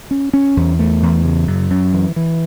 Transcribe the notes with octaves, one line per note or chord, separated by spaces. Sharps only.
C#4
C#4
E2
A3
E2
C#3
F#2
F#2
E3
E3